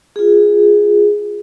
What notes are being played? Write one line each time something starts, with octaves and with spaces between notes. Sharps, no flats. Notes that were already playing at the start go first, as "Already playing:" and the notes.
F4 G#4